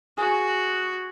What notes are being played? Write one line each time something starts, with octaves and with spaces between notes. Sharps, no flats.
F#4 G#4